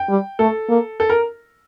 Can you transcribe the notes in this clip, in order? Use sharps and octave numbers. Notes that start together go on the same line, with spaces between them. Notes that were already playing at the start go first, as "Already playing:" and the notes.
Already playing: G5
G3
A3 A4
A#3
A4
A#4